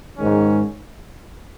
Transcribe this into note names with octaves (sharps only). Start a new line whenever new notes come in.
G#2 D#3 G#3 C#4